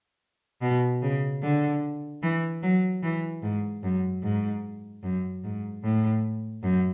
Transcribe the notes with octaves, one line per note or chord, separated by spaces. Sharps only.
B2
C#3
D3
E3
F#3
E3
G#2
F#2
G#2
F#2
G#2
A2
F#2